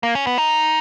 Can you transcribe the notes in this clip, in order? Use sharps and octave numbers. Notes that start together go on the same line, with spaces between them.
A#3
C#4
B3
D#4